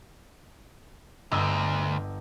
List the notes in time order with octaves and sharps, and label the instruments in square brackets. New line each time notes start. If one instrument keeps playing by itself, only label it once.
[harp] G1 D#5 E6 [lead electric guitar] D2